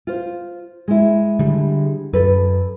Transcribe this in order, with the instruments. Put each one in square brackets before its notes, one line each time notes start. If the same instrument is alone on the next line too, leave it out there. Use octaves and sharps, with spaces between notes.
[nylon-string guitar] F4 C5
G#3 E4
[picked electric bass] D3 G3
[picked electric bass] F#2 [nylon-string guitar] A4 B4